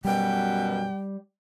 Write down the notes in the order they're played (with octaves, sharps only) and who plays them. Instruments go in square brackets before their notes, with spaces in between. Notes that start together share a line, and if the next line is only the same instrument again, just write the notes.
[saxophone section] F#2 B2 [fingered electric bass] G3 [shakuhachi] G5